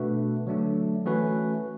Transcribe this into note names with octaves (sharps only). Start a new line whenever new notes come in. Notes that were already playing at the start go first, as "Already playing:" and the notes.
Already playing: B2 A3 D4 F#4 B4
D3 F#3 A3 D4
E3 A3 C#4 F#4 B4